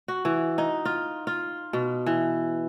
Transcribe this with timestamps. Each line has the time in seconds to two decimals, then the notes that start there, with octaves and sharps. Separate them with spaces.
0.08 F#4
0.25 E3
0.58 D#4
0.85 F4
1.27 F4
1.73 B2
2.06 E3